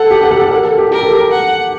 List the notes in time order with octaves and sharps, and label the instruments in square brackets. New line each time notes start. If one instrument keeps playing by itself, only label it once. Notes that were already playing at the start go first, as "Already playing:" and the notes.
Already playing: [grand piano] A4 [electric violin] F#5
[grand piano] G4
A4
A4
G4
A4
A#4
A4
G4
[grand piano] G4 [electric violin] A#4
[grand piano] A4
G4
[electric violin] F#5